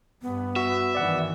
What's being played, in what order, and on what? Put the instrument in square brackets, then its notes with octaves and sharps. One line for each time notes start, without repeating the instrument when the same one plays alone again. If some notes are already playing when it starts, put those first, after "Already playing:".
[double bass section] G2 [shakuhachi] B3
[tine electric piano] F#4 [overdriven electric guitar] E5
[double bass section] G2 D#3 E3 [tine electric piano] D5 F#5